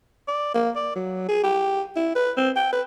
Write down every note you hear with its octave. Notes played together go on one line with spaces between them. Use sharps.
D5
A#3
D5
F#3
G#4
G4
E4
B4
C4
G5
B4